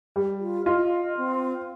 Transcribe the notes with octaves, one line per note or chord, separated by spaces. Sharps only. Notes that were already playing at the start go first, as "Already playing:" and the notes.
G3
F4
F4 D#5
C4